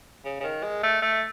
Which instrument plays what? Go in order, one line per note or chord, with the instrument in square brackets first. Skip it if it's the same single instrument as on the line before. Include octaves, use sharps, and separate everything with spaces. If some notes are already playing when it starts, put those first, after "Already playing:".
[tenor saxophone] C#3
C#3
D#3
G#3
A3
A3